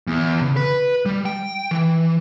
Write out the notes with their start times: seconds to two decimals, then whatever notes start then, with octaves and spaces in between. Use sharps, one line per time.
0.07 E2
0.41 C#3
0.56 B4
1.06 G3
1.26 G5
1.71 E3